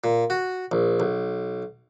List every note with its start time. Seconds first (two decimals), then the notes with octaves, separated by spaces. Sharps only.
0.04 A#2
0.30 F#4
0.72 A#1
1.00 B1